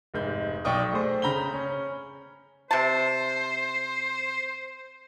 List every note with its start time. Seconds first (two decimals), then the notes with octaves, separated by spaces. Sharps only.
0.14 F1 G#2 G6
0.65 B1 D#4 D5 G5 C#6 D#6
0.92 A3 G#4 C5
1.22 C#3 A#5 B5 G6 G7
1.54 C#4
2.71 C3 C5 A5